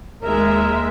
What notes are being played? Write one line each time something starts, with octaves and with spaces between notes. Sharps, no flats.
D#2 G#3 A#4 E5